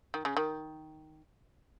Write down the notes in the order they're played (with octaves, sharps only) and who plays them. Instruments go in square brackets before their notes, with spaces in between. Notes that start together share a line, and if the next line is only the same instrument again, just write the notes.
[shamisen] D#3
C#3
D#3